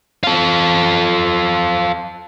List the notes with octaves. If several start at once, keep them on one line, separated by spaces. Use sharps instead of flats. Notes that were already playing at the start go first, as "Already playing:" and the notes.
F4 A4